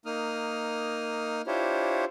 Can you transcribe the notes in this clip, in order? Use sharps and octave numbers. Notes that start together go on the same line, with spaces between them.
A#3 D#4 D#6 F6
D4 E4 F4 G4 C5 C#5